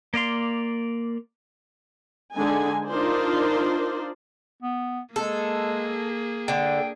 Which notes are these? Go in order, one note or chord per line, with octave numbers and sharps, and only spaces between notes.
A#3 D5 F5 C6
D3 G#3 D#4 G#5
D4 D#4 F4 A#4 C5 D5
B3
G#3 A#3 G#4 A4
D3 G5